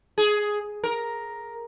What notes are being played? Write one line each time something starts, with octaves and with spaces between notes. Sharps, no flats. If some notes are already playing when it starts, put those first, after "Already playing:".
G#4
A#4